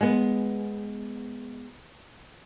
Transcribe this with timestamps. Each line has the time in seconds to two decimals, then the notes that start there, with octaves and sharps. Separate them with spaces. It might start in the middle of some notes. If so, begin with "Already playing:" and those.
0.01 G#3 B3